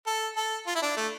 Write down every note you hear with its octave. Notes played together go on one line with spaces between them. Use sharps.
A4
A4
F4
E4
D4
A3